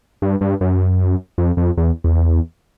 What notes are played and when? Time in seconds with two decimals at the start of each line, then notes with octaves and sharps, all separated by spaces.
0.22 G2
0.41 G2
0.61 F#2
1.38 F2
1.57 F2
1.77 E2
2.04 E2